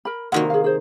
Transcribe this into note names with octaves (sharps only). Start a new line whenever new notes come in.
A#4 B5
C3 D#3 A#3 F#4 F#5
G#4 F5
G#4 C5